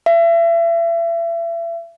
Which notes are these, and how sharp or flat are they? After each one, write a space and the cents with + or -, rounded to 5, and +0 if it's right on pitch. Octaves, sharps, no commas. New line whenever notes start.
E5 +35